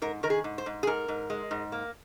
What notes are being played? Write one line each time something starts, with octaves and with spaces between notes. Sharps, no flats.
G#2 A#4
D#3 A#4
G#4
G#2
C5
G#2
G#4
G#2 A#4
G#2
G#3
G#2
A#3